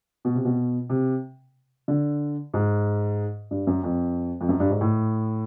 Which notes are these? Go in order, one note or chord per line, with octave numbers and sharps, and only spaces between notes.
B2
C3
B2
C3
D3
G#2
G2
F#2
F2
F2
F#2
G2
G#2
A2